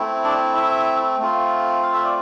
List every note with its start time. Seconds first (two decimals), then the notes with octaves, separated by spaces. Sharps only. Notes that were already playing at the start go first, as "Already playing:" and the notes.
Already playing: A3 C4 E4
0.24 D4 D5
0.56 E4 E5
1.19 A3 C4 F4
1.83 F5
1.94 E5
2.04 D5